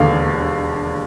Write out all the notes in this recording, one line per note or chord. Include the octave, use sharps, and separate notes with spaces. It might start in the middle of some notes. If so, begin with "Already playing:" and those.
Already playing: E1 D#2 D3 F5